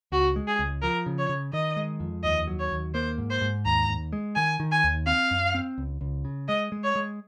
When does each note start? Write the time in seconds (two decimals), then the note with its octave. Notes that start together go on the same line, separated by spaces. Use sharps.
0.12 C#2 F#4
0.36 G#3
0.47 G#4
0.59 C#2
0.82 F3 A#4
1.06 C#3
1.18 C#5
1.29 C#3
1.53 D#3 D#5
1.76 G#3
2.00 F2
2.23 D#2 D#5
2.47 F#3
2.59 C#5
2.71 D#2
2.94 A#3 C5
3.18 G#2
3.30 C5
3.41 G#2
3.65 D#2 A#5
3.88 D#2
4.13 G#3
4.36 D#3 G#5
4.60 D#3
4.72 G#5
4.84 D#2
5.06 C4 F5
5.31 F#2
5.54 C4
5.78 C#2
6.01 C#2
6.25 C#3
6.48 G#3 D#5
6.72 G#3
6.84 C#5
6.96 G#3